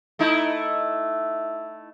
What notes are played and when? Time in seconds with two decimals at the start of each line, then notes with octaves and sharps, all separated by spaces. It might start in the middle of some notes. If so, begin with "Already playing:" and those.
0.19 A3 D#4 E4